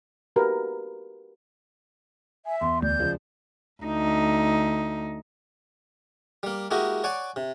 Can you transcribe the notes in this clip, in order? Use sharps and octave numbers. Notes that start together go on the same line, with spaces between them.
F#4 G4 A#4 B4
E5 G#5
E2 C6
D2 D5 G6
C#2 F3 G#3
D2 D#4
G3 A#3
G#3 A#3 E4 F#4 G4 D#5
C#5 D5 F#5 G#5 D6
C3